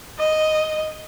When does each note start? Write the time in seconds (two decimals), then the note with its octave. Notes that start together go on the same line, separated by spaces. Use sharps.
0.19 D#5